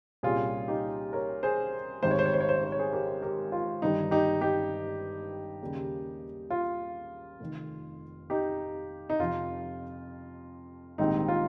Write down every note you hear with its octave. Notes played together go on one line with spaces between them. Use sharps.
C2 A#2 G3 C#4 F4 G#4
D#4 G4
A#4 C#5
G#4 C5
G#1 G#2 D#3 G3 C5
C#5
C5
C#5
C5
C#5
C5
C#5
C5
C#5
G#4 C5
G4 A#4
G4 A#4
F4
G1 G2 D#3 G3 D#4
D#4 G4
D#4 G4
D#2 C#3 G3 A#3
F4
F1 F2 D#3
D#4 G4
D#4
F2 C3 F3 F4
A#1 G#2 D#3 G3 C4 D#4
F4